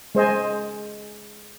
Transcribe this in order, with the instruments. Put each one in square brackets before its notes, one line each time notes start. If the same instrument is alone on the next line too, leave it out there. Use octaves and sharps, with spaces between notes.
[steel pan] G#3 C5 D#5 G#5